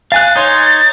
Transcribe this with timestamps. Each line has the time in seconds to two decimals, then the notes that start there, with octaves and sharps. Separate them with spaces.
0.12 F5 G#5 F#6 A6
0.36 D#4 C#5 C6